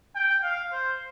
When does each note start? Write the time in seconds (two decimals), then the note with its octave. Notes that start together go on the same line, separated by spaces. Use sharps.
0.15 G5
0.43 F5
0.72 C5